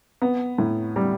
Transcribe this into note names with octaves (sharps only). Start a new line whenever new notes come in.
B3
A2
G3